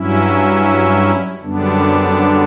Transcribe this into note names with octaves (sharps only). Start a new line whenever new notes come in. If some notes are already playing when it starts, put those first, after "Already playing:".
Already playing: G2 F#3 C#4 E4
F#2 D3 G3 B3 D4